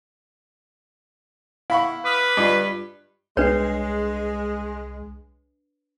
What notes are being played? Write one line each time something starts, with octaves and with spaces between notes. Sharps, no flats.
E4 F5 F#5 B5 C#6
B4 D6 D#6 F6
G2 F4 D#5
C2 G#3 D4 B4 C#5 C7